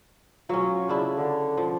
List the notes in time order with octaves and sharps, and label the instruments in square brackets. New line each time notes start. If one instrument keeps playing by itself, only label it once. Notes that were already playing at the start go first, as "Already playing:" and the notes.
[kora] F#3 C#4 [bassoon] F4
[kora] C#3 D4 E4
[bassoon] D3
[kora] F3